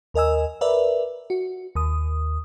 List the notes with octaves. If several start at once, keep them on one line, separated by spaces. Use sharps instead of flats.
D#2 A#4 D#5 G#5 E6
A#4 B4 D5 E5
F#4
D#2 D#6